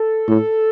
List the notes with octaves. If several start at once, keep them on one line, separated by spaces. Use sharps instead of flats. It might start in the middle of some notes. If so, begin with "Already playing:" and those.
Already playing: A4
A2